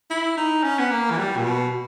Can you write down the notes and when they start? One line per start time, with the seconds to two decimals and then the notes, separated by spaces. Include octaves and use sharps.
0.10 E4
0.37 D#4
0.63 C#4
0.79 B3
0.90 A#3
1.11 E3
1.17 G3
1.37 A#2
1.44 B2